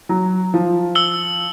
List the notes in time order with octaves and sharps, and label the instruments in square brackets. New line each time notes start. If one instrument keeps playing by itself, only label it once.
[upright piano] F#3
F3
[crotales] E6 G7